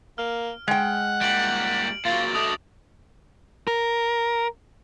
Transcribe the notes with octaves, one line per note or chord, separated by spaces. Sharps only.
A#3 F6
G#3 F#5 G5
A#2 G3 D7 F#7
A#2 F#3 F4 A6
B2 A3 D4 D#6
A#4